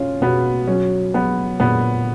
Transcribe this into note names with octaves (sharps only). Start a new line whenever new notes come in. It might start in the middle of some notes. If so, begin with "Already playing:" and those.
Already playing: B2 C#4 F4
B2 B3
F#3 C#4
F#3 B3
A#2 B3